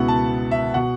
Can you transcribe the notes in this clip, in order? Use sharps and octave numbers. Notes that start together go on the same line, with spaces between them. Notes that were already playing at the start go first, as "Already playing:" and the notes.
Already playing: C#2 B2 B3 E4 F#5
A5
E5
B2 F#5